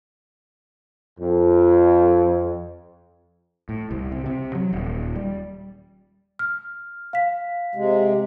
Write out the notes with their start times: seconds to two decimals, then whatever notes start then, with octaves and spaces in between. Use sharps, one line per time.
1.19 F2
3.69 A2
3.91 C2
4.12 C3
4.26 C3
4.55 F#3
4.73 D#1
5.16 G3
6.39 F6
7.13 F5 B6
7.75 C3 G#3